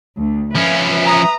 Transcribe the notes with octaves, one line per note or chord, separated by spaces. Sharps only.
D2
F3 C#4 B4 E5
A#5 D#6